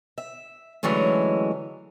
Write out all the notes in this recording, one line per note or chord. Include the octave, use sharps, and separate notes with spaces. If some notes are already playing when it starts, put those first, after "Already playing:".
E5
D3 E3 F#3 G#3 A3 C#4